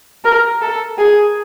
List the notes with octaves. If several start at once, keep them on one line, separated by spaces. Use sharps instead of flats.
A#4
A4
G#4